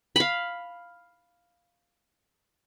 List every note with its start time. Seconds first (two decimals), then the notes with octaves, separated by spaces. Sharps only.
0.16 F5 B5